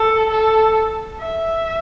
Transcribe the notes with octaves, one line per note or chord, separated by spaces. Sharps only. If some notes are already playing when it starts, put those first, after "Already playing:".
Already playing: A4
A4
E5